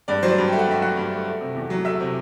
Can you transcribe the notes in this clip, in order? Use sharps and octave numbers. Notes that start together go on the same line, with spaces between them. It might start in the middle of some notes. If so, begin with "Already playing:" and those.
G2 D5
F#3 C5
D5
G2
A3 G5
F#5
G2 E5
F#3 F#4 F#5
G2
A3
A3
C3
E2
F#3
A3 E5 E6
C3